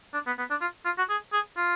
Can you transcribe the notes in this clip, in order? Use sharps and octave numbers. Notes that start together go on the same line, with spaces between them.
D4
B3
B3
D4
F4
F4
F#4
G#4
G#4
F4